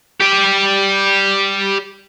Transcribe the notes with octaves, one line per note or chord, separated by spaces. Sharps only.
G4 D5